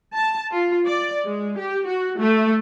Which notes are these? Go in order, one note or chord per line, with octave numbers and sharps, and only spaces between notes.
A5
F4
D5
G#3
G4
F#4
A3